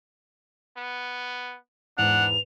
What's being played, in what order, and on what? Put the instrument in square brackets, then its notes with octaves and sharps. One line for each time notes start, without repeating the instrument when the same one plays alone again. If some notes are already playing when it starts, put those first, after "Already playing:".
[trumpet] B3
[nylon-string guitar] E2 G#2 E3 [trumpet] D4 [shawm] F#5 [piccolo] F7